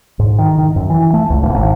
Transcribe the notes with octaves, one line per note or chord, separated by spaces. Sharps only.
G#2
D#3
D#3
F#2
E3
A3
C#2
D1
G#1